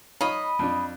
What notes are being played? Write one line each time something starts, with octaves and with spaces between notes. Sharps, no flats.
D#4 C#5 D#5 F5 B5
F2 D4